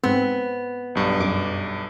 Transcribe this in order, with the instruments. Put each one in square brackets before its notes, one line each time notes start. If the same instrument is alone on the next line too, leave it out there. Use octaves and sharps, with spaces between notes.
[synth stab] G#2 C4 [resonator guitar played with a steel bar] B3
[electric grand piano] B1 G2
[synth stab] F#2 D6